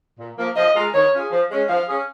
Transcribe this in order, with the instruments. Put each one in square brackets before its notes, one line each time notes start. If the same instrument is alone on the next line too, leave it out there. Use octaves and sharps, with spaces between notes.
[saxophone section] A#2
F3 A#3
[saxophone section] F3 [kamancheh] D#5
[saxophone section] G#3 F4 A#4
[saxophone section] D#3 [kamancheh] C#5
[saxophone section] C#4 F4 G#4
F3
G#3 C#4
[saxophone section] F3 [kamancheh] F5
[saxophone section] C#4 G#4